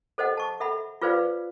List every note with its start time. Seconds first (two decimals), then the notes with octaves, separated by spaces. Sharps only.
0.18 A4 C5 D#5 F#5
0.37 A5 C#6
0.60 A4 E5 F#5 B5
1.02 F4 G#4 B4 C5 D5 F5